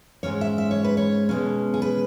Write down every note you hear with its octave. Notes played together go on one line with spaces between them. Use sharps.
G#2 G#3 C#4 C#5
E5
E5
C#5
B4
C#5
B2 G#3 C#4
G#4
B4